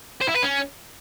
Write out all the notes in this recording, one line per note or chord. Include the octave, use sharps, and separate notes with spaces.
C5
E4
B4
C#4